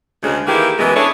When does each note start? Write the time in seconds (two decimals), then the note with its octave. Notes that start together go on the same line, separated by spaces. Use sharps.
0.23 D2 C#3 G#3
0.47 D#3 E3 A#3 E4 G4 G#4
0.79 F#2 B2 E3 G#3
0.96 C#4 D4 E4 G#4 A4 C#5